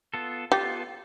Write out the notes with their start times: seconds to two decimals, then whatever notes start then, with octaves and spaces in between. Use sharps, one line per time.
0.14 B3 F4 A4
0.52 B3 F4 G4 A4